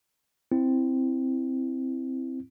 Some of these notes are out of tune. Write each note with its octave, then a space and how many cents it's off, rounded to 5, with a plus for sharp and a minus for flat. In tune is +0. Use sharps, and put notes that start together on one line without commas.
C4 +0 E4 +0